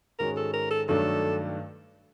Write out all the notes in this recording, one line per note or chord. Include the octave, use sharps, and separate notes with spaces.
G#2 D#3 G#3 C#4 F#4 A#4
A4
A#4
A4
G2 D#3 F#3 A3 D4 A4